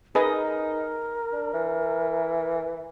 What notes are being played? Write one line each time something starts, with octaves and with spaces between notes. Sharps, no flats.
D#4 G#4 A#4 B4 D#5
D4
E3